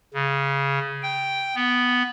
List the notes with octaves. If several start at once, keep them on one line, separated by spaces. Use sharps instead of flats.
C#3
G5
B3